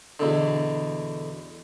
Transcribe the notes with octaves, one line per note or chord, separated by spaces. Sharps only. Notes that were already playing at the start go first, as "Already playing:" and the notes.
E2 B2 D3